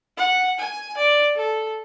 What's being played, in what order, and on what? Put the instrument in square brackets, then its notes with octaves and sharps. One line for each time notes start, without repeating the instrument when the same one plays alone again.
[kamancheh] F#5
G#5
D5
A4